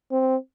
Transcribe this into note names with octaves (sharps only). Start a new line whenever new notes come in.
C4